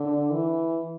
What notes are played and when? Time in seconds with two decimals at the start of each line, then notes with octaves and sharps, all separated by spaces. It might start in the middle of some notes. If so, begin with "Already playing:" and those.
Already playing: D3
0.31 E3